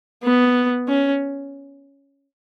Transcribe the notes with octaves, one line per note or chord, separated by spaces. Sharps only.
B3
C#4